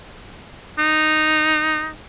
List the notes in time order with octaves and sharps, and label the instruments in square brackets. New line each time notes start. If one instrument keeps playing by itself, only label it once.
[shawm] D#4